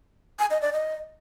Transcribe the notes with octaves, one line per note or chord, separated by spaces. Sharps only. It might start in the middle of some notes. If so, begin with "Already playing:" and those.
G#5
D#5
D5
D#5